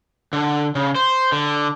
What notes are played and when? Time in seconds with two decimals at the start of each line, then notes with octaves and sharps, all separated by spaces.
0.33 D3
0.75 C#3
0.96 C5
1.32 D3